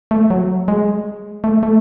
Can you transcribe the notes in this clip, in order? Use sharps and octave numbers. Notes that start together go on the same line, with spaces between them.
A3
F#3
G#3
A3
A3